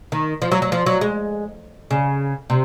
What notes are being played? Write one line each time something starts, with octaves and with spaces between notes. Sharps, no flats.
D#3
F3
F#3
F#3
F3
F#3
G#3
C#3
C3